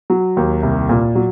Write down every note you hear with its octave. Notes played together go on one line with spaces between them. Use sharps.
F#3
D#2
C2
A#2
F#3